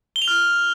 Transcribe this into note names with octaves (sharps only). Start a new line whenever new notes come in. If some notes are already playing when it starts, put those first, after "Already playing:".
G7
F7
F6